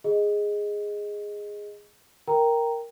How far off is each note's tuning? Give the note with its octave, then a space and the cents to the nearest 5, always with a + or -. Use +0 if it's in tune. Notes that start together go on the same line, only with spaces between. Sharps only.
G#4 -5 D#5 +0
A#4 +0 G5 +0 A#5 +0